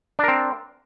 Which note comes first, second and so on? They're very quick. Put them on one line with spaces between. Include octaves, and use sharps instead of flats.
D4 A#4 C4